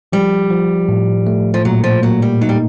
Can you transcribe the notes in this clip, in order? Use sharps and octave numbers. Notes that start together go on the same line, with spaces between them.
F3 G3
F3
A2
A3
F3
A#2 F#3
F3
F#3 A#3
G3
F#3 D#4
G3